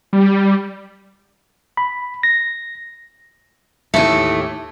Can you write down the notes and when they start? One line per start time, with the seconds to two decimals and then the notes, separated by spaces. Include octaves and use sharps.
0.13 G3
1.77 B5
2.23 A#6
3.94 D#2 A2 E3 A3